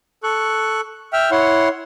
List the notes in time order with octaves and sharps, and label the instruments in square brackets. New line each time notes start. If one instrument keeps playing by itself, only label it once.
[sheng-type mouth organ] A4 C#6 F#6
E5 G5 F6
E4 C#5 F#5 C6